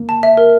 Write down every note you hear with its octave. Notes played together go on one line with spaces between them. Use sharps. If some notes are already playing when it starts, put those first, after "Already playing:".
Already playing: A#3
A5
E5
A#4